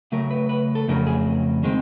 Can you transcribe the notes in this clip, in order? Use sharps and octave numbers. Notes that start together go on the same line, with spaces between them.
C#3 F#3 A3 A#4
B4
B4
A4
F2 C#3 F#3 A3 C#4 A#4
G#4
D#3 G#3 C4